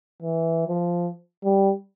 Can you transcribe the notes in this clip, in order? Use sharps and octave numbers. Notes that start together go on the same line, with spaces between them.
E3
F3
G3